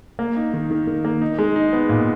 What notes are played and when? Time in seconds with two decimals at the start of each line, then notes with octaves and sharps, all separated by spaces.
0.19 A#3
0.37 D#4
0.54 D#3
0.71 D#3
0.87 D#3
1.05 A#3
1.22 D#4
1.39 G#3
1.56 D#4
1.73 B3
1.89 A#2